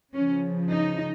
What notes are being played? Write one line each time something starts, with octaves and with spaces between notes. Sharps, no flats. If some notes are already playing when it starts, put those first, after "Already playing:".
C#3 F3 C#4
D#4